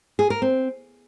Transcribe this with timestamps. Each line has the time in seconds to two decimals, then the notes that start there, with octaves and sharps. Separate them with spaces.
0.19 G#4
0.30 A#4
0.42 C4